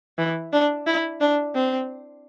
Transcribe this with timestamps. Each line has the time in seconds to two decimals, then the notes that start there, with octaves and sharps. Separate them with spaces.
0.18 E3
0.52 D4
0.87 E4
1.20 D4
1.55 C4